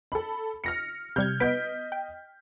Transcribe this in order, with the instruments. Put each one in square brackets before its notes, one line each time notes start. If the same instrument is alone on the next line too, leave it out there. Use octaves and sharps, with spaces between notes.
[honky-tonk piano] A4 B5
F6 A#6 C#7
[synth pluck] C3 G3 G#6 [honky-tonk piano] F6 G6
[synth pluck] B3 B4 D7 [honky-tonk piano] D#5 G6 B6
[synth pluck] G5